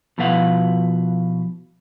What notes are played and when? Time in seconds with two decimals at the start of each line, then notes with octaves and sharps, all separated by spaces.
0.18 B2 F3 E4 B4 F5 F#5